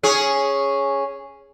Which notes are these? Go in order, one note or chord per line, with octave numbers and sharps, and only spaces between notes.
C#4 G#4